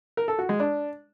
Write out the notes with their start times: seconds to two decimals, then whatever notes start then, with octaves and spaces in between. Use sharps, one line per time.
0.17 A#4
0.28 A4
0.39 F#4
0.49 G#3
0.60 D4